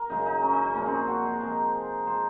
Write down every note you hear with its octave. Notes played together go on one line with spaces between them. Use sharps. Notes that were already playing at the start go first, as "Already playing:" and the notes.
Already playing: A#4
F#2 C#3 G#3 D#4
D#4
C#4
D#4
D#4
A#2 F3 G#3 C#4
C4
F#4
G#4
C3 F3 G#3 A#4
F3 G#3 C5